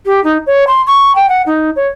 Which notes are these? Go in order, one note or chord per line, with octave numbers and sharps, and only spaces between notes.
G4
D#4
C#5
C6
C#6
G5
F#5
D#4
C#5